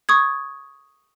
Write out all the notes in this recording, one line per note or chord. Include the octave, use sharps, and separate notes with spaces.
C#6 D#6 G#6